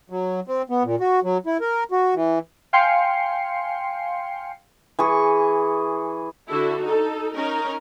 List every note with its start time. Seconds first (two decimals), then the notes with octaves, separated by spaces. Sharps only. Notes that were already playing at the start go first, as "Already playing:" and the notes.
0.10 F#3
0.48 C4
0.70 B3
0.84 A#2
1.01 F#4
1.23 F#3
1.46 E4
1.61 A#4
1.92 F#4
2.14 E3
2.73 F5 G5 G#5 C6 C7 C#7
4.99 E3 G#4 C#6
6.49 D3 E4 F#4 A4
6.82 D#4 A4
7.35 C#4 D#4 A#4